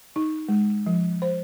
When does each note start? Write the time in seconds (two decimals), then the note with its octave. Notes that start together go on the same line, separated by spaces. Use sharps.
0.16 D#4
0.49 G#3
0.86 F3
1.22 C5